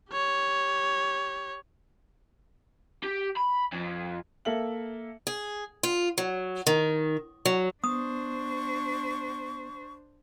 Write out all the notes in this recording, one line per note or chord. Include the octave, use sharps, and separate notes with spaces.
G4 C#5
G4
B5
F2
A#3 A4 E5 F#7
G#4
F4
F#3
D#3
F#3
B3 D4 C5 C#6 D#6